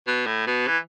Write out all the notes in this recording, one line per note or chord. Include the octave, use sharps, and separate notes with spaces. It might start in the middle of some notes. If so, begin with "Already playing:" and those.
B2
A2
B2
E3